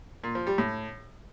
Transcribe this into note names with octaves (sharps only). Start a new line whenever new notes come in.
A#2
F3
G3
A2